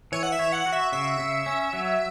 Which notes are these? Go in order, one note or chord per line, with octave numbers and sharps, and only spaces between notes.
E3 C#5
F#5
E5
C#5
F#5
F#4
E5
C#3 E5
C#3
C#4
F#3